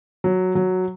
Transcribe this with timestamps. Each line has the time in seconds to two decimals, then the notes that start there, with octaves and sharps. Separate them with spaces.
0.24 F#3
0.55 F#3